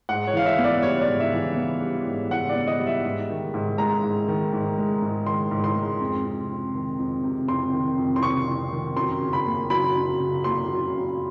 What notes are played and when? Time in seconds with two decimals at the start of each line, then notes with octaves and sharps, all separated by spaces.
0.09 G#2 F#5
0.27 C#5
0.33 E3 F5
0.46 E5
0.58 B3
0.64 D5
0.82 G3 C#5
1.01 D5
1.07 G#2
1.20 E5
1.32 E3
1.56 B3
1.82 G3
2.07 G#2
2.30 E3 F#5
2.49 D5
2.55 B3
2.68 D#5
2.80 G3
2.87 E5
3.05 G#2
3.30 D#3
3.54 G#2
3.78 G#3 A#5
4.03 G#2
4.28 D#3
4.53 G#2
4.78 G#3
5.02 G#2
5.26 D#3 C6
5.51 G#2
5.64 C6
5.76 G#3
6.01 F2
6.25 C3
6.50 F2
6.75 D#3
6.99 F2
7.24 C3
7.48 F2 C6
7.73 D#3
7.98 F2
8.16 C6
8.22 C3 C#6
8.47 F2
8.71 D#3
8.96 F#2 C6
9.21 C#3
9.33 B5
9.46 A#3
9.70 F#3 B5
9.95 F#2
10.20 C#3
10.44 A#3 C6
10.69 F#3
10.94 F#2